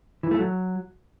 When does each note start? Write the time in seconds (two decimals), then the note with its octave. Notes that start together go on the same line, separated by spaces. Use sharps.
0.23 E3
0.31 A3
0.39 F#3